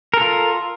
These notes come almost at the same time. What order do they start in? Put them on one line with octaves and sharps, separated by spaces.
A#4 A4 F4